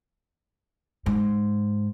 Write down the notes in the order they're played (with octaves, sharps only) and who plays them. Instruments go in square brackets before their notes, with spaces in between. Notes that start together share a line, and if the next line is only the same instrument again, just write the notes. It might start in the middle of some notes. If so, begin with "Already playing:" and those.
[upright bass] G#2